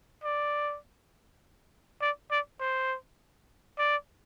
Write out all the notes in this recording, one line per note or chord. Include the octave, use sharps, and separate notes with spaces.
D5
D5
D5
C5
D5